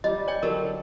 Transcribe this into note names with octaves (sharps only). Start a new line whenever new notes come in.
G3 D#5
C#5 G5 G#5
D3 F#3 A4 A#4